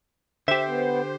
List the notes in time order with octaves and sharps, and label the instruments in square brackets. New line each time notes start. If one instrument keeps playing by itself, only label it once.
[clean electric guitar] D3 G4 [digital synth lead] C5 [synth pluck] E5
[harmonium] B3